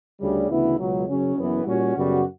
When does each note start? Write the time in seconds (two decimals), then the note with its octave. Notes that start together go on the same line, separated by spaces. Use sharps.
0.20 D2 C#3 G3
0.50 D2 C#3 E3 B3 E4
0.78 C#2 B2 F#3
1.08 F#1 F#2 C#3 F#3 C#4
1.36 F#1 F#2 E3 B3 E4
1.66 A#2 G3 C#4 F#4
1.95 F#2 C#3 G3 B3 F#4